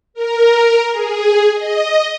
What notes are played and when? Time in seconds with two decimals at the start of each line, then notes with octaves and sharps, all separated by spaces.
0.14 A#4
0.91 G#4
1.53 D#5